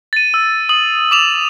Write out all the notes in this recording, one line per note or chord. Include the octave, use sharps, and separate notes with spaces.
A6 D#7
E6
D#6 F#7
D6 E7 F7